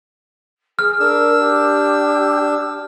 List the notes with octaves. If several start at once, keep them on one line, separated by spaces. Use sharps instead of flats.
G#4 F6
D4 A#4 E6
G4